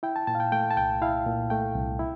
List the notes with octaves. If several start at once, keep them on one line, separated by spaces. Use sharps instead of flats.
E4 G5
A5
A#2 A5
F5
G5
A3 G5
A5
C2 G5
E4 F5
A#2
A3 G5
C2
E4